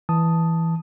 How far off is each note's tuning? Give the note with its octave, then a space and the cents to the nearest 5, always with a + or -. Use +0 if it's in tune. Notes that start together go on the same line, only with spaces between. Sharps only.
E3 +0 A5 +0 D#6 +0